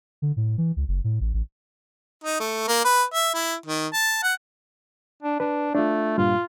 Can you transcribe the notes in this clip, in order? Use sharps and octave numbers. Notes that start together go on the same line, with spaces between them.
D3
A2
E3
C#2
F#1
A2
A1
A1
D#4
A3
A#3
B4
E5
E4
D#3
A5
F#5
D4
D4 B4
A3 D4 F4
G2 A#2 F4 F5